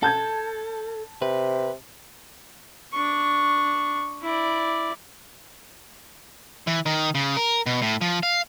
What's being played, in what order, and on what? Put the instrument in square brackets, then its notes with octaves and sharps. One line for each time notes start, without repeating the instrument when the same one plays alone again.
[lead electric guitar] A4 [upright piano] A5 G6 G#6
[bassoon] C3 [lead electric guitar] B4
[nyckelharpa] D4 C#6
E4 D5
[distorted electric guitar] E3
D#3
C#3
A#4
B2
A2
F3
F5